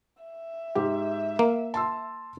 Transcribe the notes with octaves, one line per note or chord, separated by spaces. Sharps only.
E5
G#2 G4
A#3
A5 C6 E6